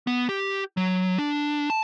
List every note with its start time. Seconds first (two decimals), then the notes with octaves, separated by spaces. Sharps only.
0.07 B3
0.29 G4
0.77 F#3
1.18 D4
1.70 A5